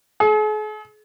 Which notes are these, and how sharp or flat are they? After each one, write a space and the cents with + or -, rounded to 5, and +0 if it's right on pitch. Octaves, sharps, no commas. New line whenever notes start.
G#4 +45